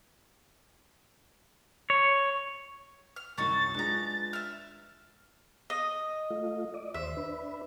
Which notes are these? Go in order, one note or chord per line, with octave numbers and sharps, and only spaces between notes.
C#5
F6
C2 F#2 C#4 D#4 F#4 A6
G#3 B3 D4 F4 A#5
E5 F6
D#5
A3 F4
D5 D#5
D#2 C5 E5
D4 B4